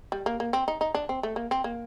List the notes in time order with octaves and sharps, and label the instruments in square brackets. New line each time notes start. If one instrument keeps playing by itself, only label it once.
[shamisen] G3
A#3
A#3
C4
D#4
D#4
D4
C4
A3
A#3
C4
A#3